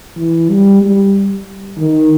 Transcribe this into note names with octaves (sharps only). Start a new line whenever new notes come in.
E3
G3
G3
D#3